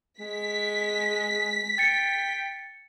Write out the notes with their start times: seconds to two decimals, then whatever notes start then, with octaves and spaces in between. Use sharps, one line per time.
0.20 G#3 B6
1.78 G5 A6 C#7